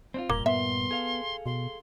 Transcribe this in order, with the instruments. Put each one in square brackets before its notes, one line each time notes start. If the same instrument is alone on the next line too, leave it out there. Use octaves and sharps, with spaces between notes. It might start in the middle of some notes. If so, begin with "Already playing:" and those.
[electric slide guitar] C4 D4 F4
[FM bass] E1 [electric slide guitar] G2 A#2 A#4 [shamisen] A#3 [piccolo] G7
[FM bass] B3 [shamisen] E5 [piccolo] C6
[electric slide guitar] G#4 A4 F5
[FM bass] B2 [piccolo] C6